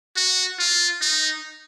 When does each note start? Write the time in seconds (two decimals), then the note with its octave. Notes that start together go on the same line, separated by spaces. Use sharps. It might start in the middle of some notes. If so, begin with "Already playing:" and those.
0.17 F#4
0.59 F4
1.01 D#4